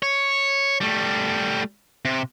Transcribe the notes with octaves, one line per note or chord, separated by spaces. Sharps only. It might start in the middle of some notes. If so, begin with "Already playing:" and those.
C#5
G3 A3
C3